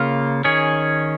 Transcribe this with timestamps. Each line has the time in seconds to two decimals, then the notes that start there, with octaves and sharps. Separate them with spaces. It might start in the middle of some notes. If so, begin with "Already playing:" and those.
Already playing: C#3 A#3 F4
0.44 D#3 C#4 G#4 C#5